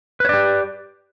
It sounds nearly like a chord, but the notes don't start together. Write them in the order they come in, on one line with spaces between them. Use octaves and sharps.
B4 C#5 D5 G4